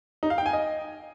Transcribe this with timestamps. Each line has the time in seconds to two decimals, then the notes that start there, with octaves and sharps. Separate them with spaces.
0.23 D#4
0.30 F5
0.38 G5
0.46 G#5
0.53 D#5